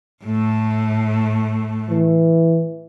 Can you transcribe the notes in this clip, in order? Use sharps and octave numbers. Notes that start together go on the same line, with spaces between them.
A2 A3
E3